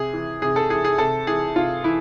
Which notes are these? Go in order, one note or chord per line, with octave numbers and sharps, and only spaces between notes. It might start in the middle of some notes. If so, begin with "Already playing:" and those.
Already playing: C3 G#4
E3
C3 G#4
A4
E3 G#4
G#4
C3 A4
E3 G#4
C3 F4
E3 E4